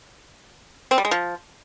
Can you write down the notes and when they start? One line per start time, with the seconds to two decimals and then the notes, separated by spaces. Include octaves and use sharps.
0.91 C4
0.98 G3
1.05 G#3
1.11 F3